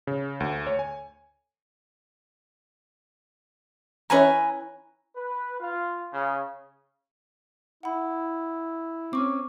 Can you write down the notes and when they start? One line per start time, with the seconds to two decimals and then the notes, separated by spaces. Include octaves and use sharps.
0.07 C#3
0.40 D2
0.67 C#5
0.79 G#5
4.10 E3 C#4 B4 E5 G#5 A#5
5.16 B4
5.60 F4
6.13 C#3
7.83 E4 F#5 B5
9.13 C4 C#4 C#6 D6